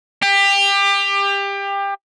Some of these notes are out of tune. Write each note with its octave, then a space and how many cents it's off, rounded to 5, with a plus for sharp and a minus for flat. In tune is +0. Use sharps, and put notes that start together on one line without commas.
G4 +25